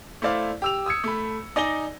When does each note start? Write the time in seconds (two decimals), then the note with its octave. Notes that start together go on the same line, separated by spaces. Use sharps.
0.22 A3 E4 C5 D5 F5
0.62 G4 E6 F7
0.86 D#6 E6 G#6 C#7
1.04 A3 B5
1.56 D#4 D5 G#5 A#6 G7